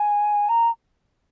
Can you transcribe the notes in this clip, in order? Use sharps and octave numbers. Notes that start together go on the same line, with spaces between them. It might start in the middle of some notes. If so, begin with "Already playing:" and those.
Already playing: G#5
A#5